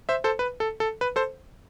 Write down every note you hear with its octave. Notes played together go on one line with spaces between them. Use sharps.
C5 E5
A4 C5
B4
A4
A4
B4
A4 C5